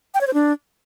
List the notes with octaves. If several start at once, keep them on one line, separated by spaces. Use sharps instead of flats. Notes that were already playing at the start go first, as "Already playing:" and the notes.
G5
C#5
C5
D4